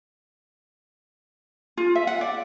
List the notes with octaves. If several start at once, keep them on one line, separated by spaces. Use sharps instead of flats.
F4
E5
F#5
D5